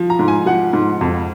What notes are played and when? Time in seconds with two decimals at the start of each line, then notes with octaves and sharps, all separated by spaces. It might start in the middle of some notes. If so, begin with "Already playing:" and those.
Already playing: F3
0.10 A#5
0.19 G#2
0.28 G#5
0.46 F3 F#5
0.73 G#2
1.01 F2